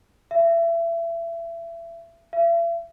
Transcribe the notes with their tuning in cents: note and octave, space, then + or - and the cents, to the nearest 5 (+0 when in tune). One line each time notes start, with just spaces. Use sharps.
E5 +30
E5 +45